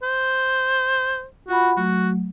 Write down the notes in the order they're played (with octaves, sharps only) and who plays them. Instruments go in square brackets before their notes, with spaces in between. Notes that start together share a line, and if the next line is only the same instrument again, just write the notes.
[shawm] C5
[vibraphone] F4 F#5 B5 [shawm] F#4
[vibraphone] F#3 A3 [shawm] F#4